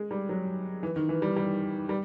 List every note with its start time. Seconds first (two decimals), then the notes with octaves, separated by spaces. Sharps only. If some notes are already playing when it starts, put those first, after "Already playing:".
Already playing: G#3
0.11 G3
0.29 F#3
0.83 E3
0.96 D#3
1.09 E3
1.22 G3
1.36 G3
1.89 G3